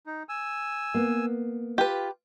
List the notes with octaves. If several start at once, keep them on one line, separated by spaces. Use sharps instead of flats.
D#4
G#5 E6
A#3 B3
F4 G4 B4